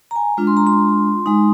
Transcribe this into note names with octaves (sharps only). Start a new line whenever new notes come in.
A#5
G#5
G#3 D4 F4
C6
A#5
C6
G#3 D#4